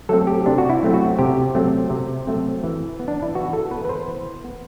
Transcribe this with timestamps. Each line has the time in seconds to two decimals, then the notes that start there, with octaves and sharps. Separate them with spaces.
0.09 F#3 A3 C4 A4
0.27 G4
0.46 C3 D4
0.58 F#4
0.70 E4
0.83 F#3 A3 C4
0.94 F#4
1.19 C3 G4
1.55 F#3 A3 C4
1.90 C3
2.27 F#3 A3 C4
2.64 E3
3.00 B3
3.08 D4
3.22 E4
3.35 E3 F#4
3.53 A4
3.71 B3 B4
3.85 B4
3.89 C5
4.08 E3
4.44 B3